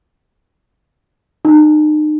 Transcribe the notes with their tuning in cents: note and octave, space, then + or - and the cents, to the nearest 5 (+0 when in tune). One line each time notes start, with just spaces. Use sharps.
D#4 -35